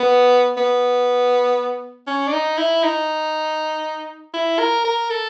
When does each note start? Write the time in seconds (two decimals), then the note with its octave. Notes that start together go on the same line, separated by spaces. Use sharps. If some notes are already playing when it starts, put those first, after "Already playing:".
Already playing: B3
0.57 B3
2.07 C#4
2.28 D4
2.33 D#4
2.58 E4
2.83 D#4
4.34 E4
4.59 A#4
4.85 A#4
5.10 A4